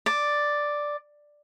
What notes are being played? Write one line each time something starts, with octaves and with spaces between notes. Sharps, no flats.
D5